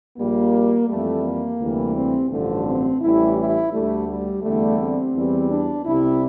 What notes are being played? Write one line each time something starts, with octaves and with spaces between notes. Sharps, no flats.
A#1 A#2 G3 A#3
F2 E3 G3 A3
A#3
D2 C3 E3 G3
C4
A1 G2 D3 F3 A3
C4
A1 A2 E3 G3 E4
E4
D2 D3 G3 A3
G3
E2 D3 G3 A3
C4
E2 E3 G3
D4
C2 C3 G3 E4